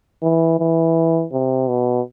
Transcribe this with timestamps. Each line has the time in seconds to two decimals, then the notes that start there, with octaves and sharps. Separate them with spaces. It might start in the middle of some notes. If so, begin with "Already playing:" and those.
0.23 E3
0.60 E3
1.32 C3
1.68 B2